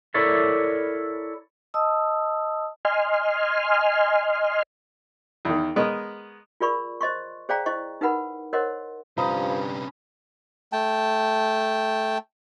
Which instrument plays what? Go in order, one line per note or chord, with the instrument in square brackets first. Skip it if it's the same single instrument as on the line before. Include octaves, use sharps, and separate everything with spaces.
[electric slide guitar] E4 A4 A#4 C#5 D5 E5
[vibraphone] D#5 A5 D#6 E6
[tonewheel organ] D#5 G#5 C6 F6
[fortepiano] E2 D#3
G#3 B3 A#4 C#5 D#5
[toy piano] F4 G#4 A#4 D5 B5 C#6
C5 D#5 C6 C#6
G#4 C5 D5 F5 G5 A#5
E4 C5 D#5 C#6
D#4 A#4 B4 F#5 B5
A#4 C5 C#5 D#5 F#5 C6
[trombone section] G2 B4 [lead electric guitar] C3 C#4 [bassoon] F3 [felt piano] A#5 B5 D#6
[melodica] A3 G5 A5